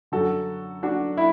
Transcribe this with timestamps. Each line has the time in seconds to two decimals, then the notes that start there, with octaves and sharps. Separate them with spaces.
0.12 F#2 D3 F#4 A4
0.83 D4 F#4
1.17 E4